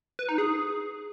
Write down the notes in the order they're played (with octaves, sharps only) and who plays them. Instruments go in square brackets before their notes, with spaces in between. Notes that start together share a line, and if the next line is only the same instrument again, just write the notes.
[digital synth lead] B4
D#4
G#4